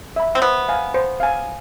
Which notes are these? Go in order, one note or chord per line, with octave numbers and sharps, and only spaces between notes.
E5 B5
C4
B3 C5
F5 G#5
C5
F5 G#5